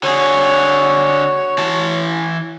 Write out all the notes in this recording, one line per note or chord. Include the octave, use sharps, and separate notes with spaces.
D3 F#4 G#4 C#5
E3 A5